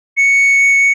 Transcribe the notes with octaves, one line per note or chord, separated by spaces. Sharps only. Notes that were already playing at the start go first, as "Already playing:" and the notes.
C#7